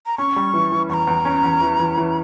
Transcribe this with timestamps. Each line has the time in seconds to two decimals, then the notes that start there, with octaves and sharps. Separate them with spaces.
0.06 A#5
0.18 C#4 C#6
0.36 G3
0.54 E3
0.72 E3
0.89 E2 C#6
0.94 A#5
1.07 E2
1.25 C#4
1.44 E2
1.61 E3
1.80 E3
1.98 E3